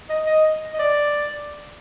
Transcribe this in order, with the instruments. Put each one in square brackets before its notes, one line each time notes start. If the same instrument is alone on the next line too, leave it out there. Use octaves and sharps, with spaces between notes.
[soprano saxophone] D#5
D#5
D#5
D5